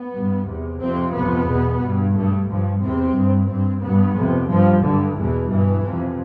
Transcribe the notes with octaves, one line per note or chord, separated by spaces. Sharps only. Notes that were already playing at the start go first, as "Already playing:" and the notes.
Already playing: B3
G2
E2 C3
F2 C3 C4
F2 C3 B3
E2 B2
G2
G2 A3
G2 F3
E2 C3 C4
G2
G2 C4
G2 B3
F2 C3
G2 F3
G2 D3
E2 B2 E3
G2 E3
F2 C3